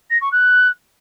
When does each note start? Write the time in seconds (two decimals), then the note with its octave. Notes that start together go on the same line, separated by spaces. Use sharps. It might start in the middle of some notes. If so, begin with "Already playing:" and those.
0.10 A#6
0.21 C#6
0.32 F#6